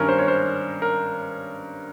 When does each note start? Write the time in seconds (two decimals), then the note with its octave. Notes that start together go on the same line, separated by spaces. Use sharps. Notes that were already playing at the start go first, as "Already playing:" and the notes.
Already playing: G2 D#3 C#4 A#4
0.09 C5
0.18 C#5
0.28 C5
0.82 A#4